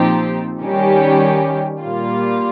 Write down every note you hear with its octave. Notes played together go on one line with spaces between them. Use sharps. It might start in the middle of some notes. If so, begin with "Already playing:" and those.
Already playing: A#2 F3 C4 D#4 G4
D#3 G3 C#4 G4
A#2 G3 A#3 F4